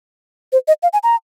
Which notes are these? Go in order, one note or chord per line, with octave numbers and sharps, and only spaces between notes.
C5
D#5
F5
G#5
A#5